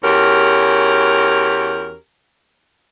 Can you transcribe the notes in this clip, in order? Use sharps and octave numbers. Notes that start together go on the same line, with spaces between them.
E2 C#4 F#4 G4 A#4